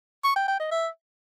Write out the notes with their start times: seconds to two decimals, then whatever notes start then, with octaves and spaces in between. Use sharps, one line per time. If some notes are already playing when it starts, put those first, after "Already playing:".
0.24 C#6
0.36 G5
0.48 G5
0.60 D#5
0.72 E5